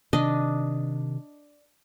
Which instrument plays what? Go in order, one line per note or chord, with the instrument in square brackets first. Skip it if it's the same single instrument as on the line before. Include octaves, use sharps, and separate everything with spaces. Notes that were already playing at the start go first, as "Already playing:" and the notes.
[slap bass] C3 D#3 [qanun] D4 D#5